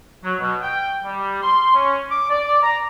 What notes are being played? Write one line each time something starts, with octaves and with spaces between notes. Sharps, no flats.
F#3
B2
G5
G3
C6
C#4
D6
D5
A#5